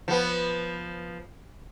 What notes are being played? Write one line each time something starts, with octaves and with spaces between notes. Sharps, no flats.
F3 B3